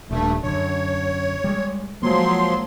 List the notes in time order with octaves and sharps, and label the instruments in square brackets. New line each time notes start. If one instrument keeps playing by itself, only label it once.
[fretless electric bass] D#1 [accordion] G2 A3
[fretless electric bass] F#2 D3 [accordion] C#5
[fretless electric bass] G3 G#3
[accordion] F3 F#3 C6 [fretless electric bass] G#3 A#3